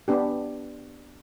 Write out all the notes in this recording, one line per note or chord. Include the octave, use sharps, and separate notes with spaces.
B3 D4 G4